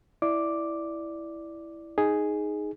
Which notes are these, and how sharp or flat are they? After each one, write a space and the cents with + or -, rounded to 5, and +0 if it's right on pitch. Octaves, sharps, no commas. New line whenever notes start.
E4 +0 D5 +0 D6 +0
D#4 +0 G#4 +0